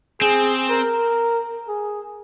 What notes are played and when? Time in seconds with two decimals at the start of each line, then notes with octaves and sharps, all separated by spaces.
0.21 C4 G#4
0.70 A#4
1.68 G#4